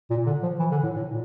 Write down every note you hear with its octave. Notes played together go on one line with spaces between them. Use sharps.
A#2
D3
F3
E3
D3
A2
A2
A#2